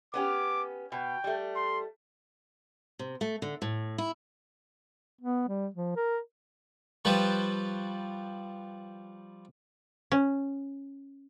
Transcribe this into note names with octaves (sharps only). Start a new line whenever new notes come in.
B3 C#4 G4 D6
B2 G5
G3 A3
C6
C3
A3
D3
A2
E4
B3
G3
F3
A#4
F3 G3 B4 A5 C#6
C#4